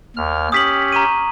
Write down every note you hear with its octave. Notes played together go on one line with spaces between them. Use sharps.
D#2 F6
C#4 G4 D#6 B6 F#7
A#5 C#6 D#7